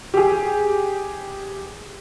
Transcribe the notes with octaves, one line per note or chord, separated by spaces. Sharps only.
G4 G#4